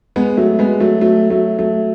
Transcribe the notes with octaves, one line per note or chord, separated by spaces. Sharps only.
G#3 B3
F#3 A3
G#3 B3
F#3 A3
F#3 A3
F#3 A3
F#3 A3